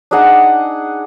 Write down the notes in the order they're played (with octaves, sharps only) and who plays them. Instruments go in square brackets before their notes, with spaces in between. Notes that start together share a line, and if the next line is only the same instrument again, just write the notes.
[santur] D4 D#4 G#4 F#5